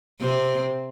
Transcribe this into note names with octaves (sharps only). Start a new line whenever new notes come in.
C3 C4